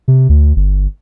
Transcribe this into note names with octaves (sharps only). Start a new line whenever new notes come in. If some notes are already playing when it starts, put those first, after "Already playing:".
C3
D2
G1